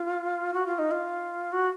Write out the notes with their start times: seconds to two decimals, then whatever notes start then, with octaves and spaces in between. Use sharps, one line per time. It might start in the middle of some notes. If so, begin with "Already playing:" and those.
Already playing: F4
0.54 F#4
0.66 F4
0.79 D#4
0.91 F4
1.52 F#4